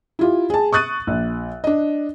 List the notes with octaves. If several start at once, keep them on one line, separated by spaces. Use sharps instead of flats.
E4 F4 G4
G#4 A5
C#6 D#6 F#6 A6 D#7
A#1
D4 D#5